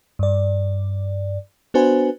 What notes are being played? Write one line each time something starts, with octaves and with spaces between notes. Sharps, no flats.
G2 D5
B3 D4 F#4 B4 C5 G#5